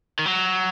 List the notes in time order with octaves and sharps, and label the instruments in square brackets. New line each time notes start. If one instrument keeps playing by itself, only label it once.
[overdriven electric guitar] D#3
F#3